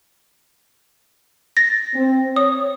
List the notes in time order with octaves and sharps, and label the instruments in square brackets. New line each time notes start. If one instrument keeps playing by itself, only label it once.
[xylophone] A6 A#6
[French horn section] C4
[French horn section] C#5 [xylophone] D#6